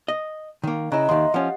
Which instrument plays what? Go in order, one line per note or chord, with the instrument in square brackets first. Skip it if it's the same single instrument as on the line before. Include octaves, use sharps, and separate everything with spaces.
[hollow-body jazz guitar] D#5
D#3 A#3
[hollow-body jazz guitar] C#3 E4 [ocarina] D#5 [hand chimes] A#5 F#6
[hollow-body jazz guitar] D#2 D#3 [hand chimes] E5 C6
[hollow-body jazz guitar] F3 C#4 [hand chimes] G4 D#5 F#5